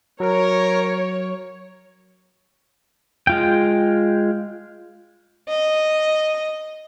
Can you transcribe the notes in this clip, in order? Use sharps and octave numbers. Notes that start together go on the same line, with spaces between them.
F#3 A#4 C#5
G#3 F4 G5
D#5